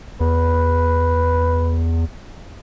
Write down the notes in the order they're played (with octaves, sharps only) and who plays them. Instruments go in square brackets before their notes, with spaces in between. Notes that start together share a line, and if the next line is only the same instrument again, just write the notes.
[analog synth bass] E2 [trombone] B4